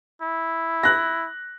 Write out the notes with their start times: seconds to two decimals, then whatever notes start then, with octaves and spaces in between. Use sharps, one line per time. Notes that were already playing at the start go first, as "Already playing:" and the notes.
0.22 E4
0.83 F#6 A#6